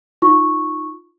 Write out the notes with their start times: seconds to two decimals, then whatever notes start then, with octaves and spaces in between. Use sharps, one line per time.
0.22 D#4 F4 C#6